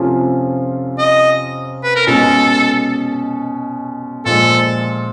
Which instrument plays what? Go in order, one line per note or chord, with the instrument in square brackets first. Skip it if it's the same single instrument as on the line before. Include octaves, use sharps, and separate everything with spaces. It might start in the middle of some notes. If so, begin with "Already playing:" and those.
Already playing: [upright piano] C3 F3 A3 C#4 F4
[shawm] D#5
B4
A#4
[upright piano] B2 G#3 C#4 [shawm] A4
[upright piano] A#2 F3 G#3 [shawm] A4